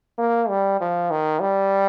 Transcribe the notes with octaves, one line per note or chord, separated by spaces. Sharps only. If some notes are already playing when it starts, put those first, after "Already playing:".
A#3
G3
F3
D#3
G3